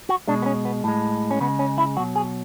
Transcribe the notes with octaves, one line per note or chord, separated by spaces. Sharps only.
F#4
B2 G#3 D4
B3
C#4
B3
A2 G#3
C#4
C#3 G#3 B3
C#4
E4
B2 F#3 F#4
G#4